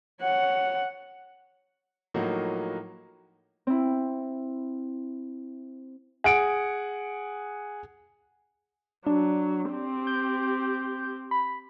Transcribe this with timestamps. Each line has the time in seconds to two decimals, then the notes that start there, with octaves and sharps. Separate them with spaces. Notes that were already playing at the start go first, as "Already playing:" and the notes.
0.22 C#5 F#5
2.14 A2 F3 F#3 A#3 D#4 F#4
3.67 C4 E4
6.24 G#4 F#5 D7
9.07 F#3 D4
9.72 C4 G4
10.07 G6
11.31 B5